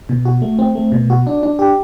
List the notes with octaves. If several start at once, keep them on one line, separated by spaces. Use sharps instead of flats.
B2
F#4
A3
C4
A3
B2
F#4
D4
D4
G4